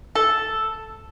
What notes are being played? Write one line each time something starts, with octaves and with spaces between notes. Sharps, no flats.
A4